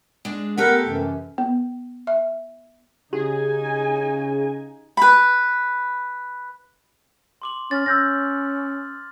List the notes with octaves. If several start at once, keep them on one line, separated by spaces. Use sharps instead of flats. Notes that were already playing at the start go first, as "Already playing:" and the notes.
G#3 D4
A3 B3 G4 A4 A#4 F#5
F#2 C3 E3
B3
E5
C#3 D#4 G4 G#4 G#5
B4 B5
C6 D6 F#7
C#4 F6 A6
C#4 E6 G6 A#6